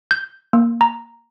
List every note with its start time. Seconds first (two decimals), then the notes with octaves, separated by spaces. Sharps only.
0.11 G6
0.53 A#3
0.81 A#5